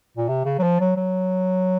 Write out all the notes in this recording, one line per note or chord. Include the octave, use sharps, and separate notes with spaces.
A#2
C3
C#3
F#3
F3
F#3
F#3